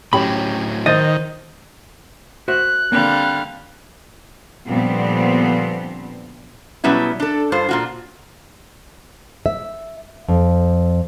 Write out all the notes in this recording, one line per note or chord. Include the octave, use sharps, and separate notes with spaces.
A2 F#3 C#4 G4 B5
D#3 C5 D#5 G6 A6
F#4 C5 E5 F#6
D3 G3 A#3 C4 F5
A#2 D3 F3 G3 B3 C4
B2 F#3 G3 B3 C#4 E4
D4 A4
G2 F4 C5
A#2 F4 F#4
E5
F2